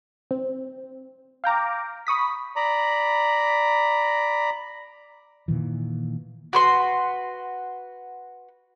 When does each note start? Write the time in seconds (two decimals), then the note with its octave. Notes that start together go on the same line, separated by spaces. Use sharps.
0.31 C4
1.44 F5 G5 A#5 D6
2.07 B5 C#6 D#6 B6
2.56 D5 A#5 B5
5.48 A#2 D#3 E3
6.53 F#4 B4 C6